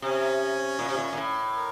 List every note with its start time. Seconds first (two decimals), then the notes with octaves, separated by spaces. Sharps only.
0.02 C3 C#4
0.79 A#2
0.89 C3
0.97 A#2
1.13 A#2
1.17 A2
1.55 A#4